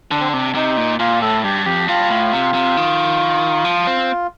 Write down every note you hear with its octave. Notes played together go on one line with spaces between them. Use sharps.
D3 D4
C4
D4
C3
C3 D#4
A#2
A#2 F4
A2 A4
G2 G4
F2 G4
G2 F4
A2
C3
C3
D#3
F3
C4